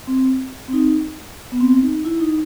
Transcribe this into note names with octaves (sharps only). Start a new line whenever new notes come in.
C4
C4
D#4
B3
C4
D#4
E4
D#4